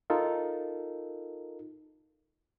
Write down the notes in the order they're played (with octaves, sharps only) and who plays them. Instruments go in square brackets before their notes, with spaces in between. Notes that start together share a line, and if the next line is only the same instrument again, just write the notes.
[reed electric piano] D#4 F4 A4 A#4